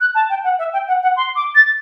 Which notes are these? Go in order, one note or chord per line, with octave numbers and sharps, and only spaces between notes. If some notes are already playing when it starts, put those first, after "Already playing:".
F#6
A5
G5
F#5
E5
G5
F#5
F#5
C6
D6
A6